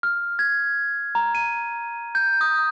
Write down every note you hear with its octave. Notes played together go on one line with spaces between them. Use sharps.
F6
G#6
A#5
D#7
G6
D#6